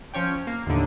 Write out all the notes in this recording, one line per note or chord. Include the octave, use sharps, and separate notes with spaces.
F3 C#4 C#5 G5
A#3
D#2 A2 D3